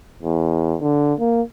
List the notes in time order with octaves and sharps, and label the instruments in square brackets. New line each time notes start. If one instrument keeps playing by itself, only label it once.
[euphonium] E2
D3
A#3